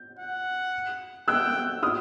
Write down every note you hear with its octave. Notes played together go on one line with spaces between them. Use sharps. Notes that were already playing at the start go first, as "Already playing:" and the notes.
Already playing: G6
F#5
G5 E6 F#6
D#6 F6